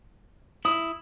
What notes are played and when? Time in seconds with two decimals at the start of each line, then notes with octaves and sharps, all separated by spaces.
0.65 E4 D#6